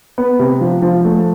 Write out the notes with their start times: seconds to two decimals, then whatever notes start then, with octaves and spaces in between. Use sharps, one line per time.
0.18 B3
0.39 C3
0.61 F3
0.82 F3
1.05 A3